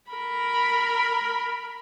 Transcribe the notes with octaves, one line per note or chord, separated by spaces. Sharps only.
A#4 B5